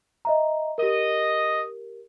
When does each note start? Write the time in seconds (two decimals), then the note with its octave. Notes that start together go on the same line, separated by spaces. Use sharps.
0.25 D#5 E5 A#5
0.78 G4 A#4 D#5